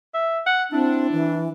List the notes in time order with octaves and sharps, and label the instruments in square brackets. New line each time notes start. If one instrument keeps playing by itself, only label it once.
[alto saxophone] E5
F#5
[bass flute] C4 [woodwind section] D4 [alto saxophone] E4
[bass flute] E3